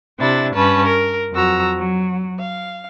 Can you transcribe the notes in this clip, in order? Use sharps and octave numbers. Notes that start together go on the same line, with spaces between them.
C3 D4 E4 A6
G2 C#4 B4 A5
A#4
F2 F#3 F#4 A#5 E6
F#3
F5